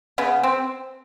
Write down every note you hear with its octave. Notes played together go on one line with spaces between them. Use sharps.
C#3 B3
C4